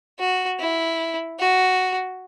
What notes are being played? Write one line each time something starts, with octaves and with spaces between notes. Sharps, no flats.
F#4
E4
F#4